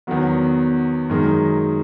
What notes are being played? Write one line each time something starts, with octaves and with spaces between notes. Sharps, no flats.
E2 D#3 F#3 B3
F#2 D#3 G#3 D#4